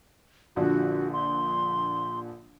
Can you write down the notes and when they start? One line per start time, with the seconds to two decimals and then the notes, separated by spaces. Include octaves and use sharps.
0.56 A#1 D3 F3 F#4
1.13 C6